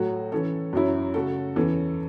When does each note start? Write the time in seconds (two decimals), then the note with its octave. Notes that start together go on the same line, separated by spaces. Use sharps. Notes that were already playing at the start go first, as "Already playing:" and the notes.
Already playing: A2 F#3 A3 F#4
0.32 E3 C#4 A4
0.73 F#2 F#3 C#4 E4
1.14 C#3 A3 F#4 A4
1.55 E2 E3 C#4 A4